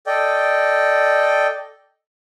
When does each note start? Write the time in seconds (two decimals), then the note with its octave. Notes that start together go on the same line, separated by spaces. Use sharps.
0.06 A4 D5 D#5 G5